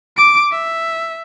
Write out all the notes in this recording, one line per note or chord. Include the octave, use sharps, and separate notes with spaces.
D6 D7
E5